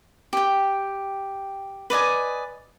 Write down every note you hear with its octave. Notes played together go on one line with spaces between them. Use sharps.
G4 G5
B4 D5 D#5 G#5